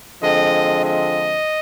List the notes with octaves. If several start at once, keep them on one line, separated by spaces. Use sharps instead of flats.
D3 F3 G#3 C4 D#5
D#5